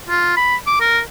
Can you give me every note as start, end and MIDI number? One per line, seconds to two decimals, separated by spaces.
0.08 0.34 65
0.37 0.56 83
0.67 0.77 86
0.80 1.00 70